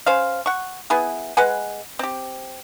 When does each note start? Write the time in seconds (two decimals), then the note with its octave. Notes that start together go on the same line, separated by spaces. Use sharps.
0.06 C#4 C5 F5
0.46 F#5 C#6
0.90 B3 E4 G#4
1.37 G#3 B4 F#5 G#5
1.99 C4 G4